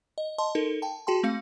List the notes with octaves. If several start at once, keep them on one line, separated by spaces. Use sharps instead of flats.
D#5
D#5 A5 C6
D#4 A4 A#4
G5 A5
F#4 G#4 G5 A5 C6
A3 C4 F5 C#7